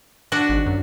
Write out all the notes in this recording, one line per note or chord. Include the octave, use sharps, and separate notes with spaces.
D4 F#4
G#1
F#2